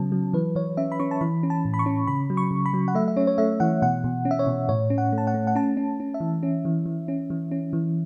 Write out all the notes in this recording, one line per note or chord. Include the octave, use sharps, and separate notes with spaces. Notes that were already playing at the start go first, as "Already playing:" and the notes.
Already playing: C#3 F#3 B3 C#4 A5
F#3
E3 B4
E3 C#5
C#4 E5
B5
C#4 C#6
A5
E3 B5
C#4
A5
A2
B5
C#6
C#4
C#3 B5
F#3
C#6
C#3
B5
F#3
F#5
A3 E5
E5
C#4 C#5
C#5
A3 E5
E3 F#5
B2 F#5
B2
C#4
E5
C#5
B2
A2 C#5
C#4
F#5
A3
A5
F#5
A3
F#5
C#4 A5
C#4
C#4
E5
E3
C#4
E3
E3
C#4
E3
C#4
E3